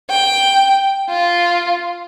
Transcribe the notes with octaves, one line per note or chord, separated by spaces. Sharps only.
G5
F4